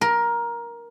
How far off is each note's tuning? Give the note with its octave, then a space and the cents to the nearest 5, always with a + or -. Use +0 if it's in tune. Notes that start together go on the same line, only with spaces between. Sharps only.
A#4 +15